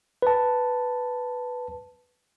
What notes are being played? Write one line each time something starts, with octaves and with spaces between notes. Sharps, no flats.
B4 A5